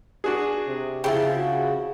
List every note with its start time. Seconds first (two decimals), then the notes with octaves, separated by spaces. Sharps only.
0.24 D4 F#4 G#4
0.68 C3
1.04 C#3 F3 E4 E5 G5
1.35 F#4